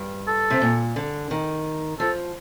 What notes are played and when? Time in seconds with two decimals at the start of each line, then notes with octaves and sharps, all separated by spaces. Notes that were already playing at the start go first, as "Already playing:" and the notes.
Already playing: G2
0.27 A4
0.50 C3
0.61 A#2
0.96 D3
1.31 D#3
2.00 F3 A4